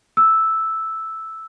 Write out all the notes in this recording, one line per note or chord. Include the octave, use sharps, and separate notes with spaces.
E6